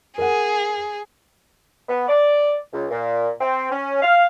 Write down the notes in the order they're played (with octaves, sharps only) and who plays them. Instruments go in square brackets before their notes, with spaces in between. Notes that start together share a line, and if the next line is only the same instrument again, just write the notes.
[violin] G#4 [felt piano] A#4 F#5
[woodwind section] B3
D5
C#2
A#2
C4
C#4
F5